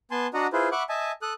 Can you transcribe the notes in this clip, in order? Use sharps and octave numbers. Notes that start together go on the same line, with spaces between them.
B3 G#5 A5 C6
D4 F#4 D#5 F#5 A#5
E4 F4 G#4 B4 C5
E5 F#5 B5 C#6 D6
D#5 E5 G#5 A5
A4 D#6 F#6